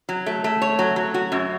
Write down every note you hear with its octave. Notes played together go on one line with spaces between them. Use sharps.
F#3
A3
A3
C#5
F#3
F#3
F#4
F#2